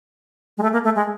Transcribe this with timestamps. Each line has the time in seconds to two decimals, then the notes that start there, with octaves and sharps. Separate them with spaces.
0.58 G#3
0.63 A3
0.73 A#3
0.84 A3
0.95 G#3